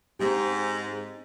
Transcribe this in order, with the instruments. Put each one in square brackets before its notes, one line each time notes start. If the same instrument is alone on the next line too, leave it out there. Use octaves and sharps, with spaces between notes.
[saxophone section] G#2 [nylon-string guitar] C4 D#4 G4